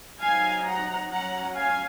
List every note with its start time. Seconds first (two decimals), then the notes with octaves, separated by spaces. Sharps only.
0.20 F#3 C4 D#4 F5 G#5
0.66 F#5 A#5
1.10 F#3 C#4 F#5 A#5
1.56 F5 G#5